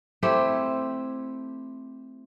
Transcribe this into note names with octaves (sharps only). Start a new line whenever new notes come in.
A3 C4 E4 G4